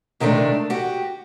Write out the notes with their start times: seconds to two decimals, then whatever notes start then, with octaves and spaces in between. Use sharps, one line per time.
0.20 C3 D#3 G#3 A3 D4
0.70 F#4 G4